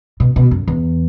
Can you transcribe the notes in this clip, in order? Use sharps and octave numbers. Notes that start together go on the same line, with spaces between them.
B2
B2
F#2
E2